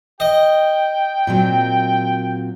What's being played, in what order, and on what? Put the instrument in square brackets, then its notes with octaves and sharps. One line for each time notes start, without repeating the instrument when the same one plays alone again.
[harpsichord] D#5 [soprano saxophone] G5
[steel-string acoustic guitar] A#2 F#3 C4